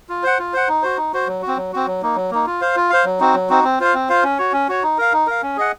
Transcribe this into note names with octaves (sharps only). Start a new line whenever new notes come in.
F4
C5 F#5
F4
C5 F#5
D#4
F#4 C5
D#4
F#4 C5
F#3
F#4
C4
F#3
C4 F#4
F#3
A#3 D#4
F#3
A#3 D#4
F4
C5 F5
F4
C5 F5
F#3
C4 D#4 F#4
F#3
C4 D#4 F#4
C4
F4 C5 F5
C4
F4 C5 F5
C#4
F#4 C#5
C#4
F#4 C#5
D#4
A#4 F5
D#4
A#4 F5
C#4
G#4 D#5 F#5